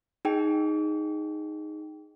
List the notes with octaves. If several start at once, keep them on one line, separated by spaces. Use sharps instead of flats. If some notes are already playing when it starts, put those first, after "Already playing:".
D#4 G#4 G5